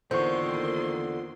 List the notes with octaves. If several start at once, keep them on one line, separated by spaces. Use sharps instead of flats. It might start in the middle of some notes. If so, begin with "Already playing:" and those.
E2 D3 D#3 A#3 F4 C5 C6 C#6